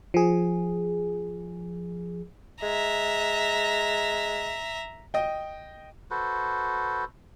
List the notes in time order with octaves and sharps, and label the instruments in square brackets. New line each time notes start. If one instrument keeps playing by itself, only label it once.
[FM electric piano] F3 G#4
[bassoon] G#3 [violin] E5 A#5
[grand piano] D#5 G5
[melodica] F#4 A4 B4 C5